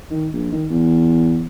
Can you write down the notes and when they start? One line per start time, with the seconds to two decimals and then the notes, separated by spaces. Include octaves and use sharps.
0.10 D#3
0.33 A#1
0.52 D#3
0.70 E2